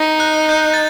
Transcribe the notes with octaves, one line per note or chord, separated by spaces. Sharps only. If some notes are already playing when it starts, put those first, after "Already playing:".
Already playing: D#4
F#6
G6
A6